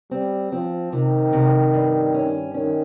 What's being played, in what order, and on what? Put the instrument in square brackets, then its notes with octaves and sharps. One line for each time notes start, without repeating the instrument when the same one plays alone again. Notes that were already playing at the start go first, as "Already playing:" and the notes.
[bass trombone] G3 [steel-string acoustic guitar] C4
[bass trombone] F3 [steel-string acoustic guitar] C4
[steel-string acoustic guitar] C3 [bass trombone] D#3
[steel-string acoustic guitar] C3
G2
C#4
[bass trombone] D#3 [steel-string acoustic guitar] C#4